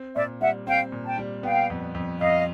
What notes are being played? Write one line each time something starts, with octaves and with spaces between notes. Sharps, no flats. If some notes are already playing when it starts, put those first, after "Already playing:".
Already playing: C4
A#2 D5 E5
G3 E5 F#5
C4 F5 G5
A#2
G5 A5
G3
B3 F5 G5
F2
F2
F2 D#5 F5